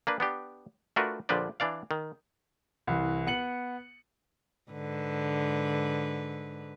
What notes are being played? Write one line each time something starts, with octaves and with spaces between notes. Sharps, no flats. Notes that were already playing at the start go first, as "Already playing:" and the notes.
A#3 D4 B4
B3 D4 G4
A3 D4 F4 F#4 A#4 B4
A#1 D3 F3 B4 C5 D5
E3 D4 D5 F5
D#3
C2 E3
B3 C#7 F#7
G#2 D3 B4